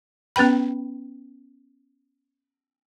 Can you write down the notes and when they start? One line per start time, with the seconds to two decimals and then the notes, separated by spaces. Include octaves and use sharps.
0.36 B3 C#4 B4 G5 B5